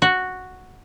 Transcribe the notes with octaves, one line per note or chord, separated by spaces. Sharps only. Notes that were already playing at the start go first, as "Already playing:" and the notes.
F#4